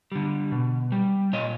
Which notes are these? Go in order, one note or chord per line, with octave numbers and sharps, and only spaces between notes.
D3 G3
B2
G3
A#2 C#5 D#5